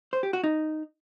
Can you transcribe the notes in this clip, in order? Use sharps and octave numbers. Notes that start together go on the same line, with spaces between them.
C5
G4
F#4
D#4